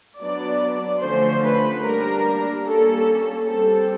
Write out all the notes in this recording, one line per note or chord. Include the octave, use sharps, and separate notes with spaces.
F#3 B3 D4 D5
D3 F3 A3 C#4 C5
B4
G3 A#3 D4 A#4
G3 A#3 C#4 A4
G3 C4 A4